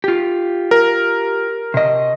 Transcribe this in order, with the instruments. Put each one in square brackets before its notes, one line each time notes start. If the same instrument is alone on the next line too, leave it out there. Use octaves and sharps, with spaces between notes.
[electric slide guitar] F4 G4
[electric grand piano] A#4
[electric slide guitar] C3 D#5